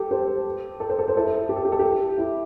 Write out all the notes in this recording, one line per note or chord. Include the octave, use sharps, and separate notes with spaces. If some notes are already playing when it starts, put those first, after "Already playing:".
Already playing: G4 A4
G4 C5
A4
C5
A4
C5
E4 A4
G4
A4
G4
A4
G4
E4